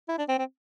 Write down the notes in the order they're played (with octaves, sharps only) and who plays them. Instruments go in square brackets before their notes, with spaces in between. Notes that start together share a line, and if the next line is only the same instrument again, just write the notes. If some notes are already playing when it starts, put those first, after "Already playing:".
[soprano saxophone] E4
D4
C4
C4